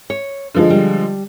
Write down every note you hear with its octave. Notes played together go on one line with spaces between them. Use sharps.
C#5
D3 F3 G#3
G3